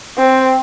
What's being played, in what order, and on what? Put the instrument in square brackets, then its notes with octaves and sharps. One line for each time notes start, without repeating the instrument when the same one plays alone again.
[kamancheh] C4